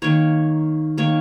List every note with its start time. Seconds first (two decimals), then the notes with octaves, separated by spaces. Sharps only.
0.02 D#3 A#3 C#5
0.98 D#3 A#3 C#5